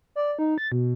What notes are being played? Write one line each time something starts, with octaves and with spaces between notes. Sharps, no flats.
D5
D#4
A6
B2